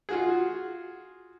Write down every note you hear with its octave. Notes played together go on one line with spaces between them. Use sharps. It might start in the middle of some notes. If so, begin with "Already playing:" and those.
F4 F#4 G#4